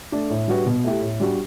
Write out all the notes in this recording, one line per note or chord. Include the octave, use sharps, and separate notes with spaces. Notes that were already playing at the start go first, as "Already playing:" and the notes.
A3 D4
A2
G3 D4 F#4 B4
B2
A3 E4 G4
A2
G3 D4 F#4